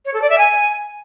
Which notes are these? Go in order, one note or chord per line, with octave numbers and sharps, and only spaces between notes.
C#5
A4
D5
E5
G#5